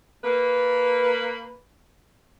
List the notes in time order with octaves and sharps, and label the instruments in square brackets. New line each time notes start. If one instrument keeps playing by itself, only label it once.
[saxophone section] A#3 B4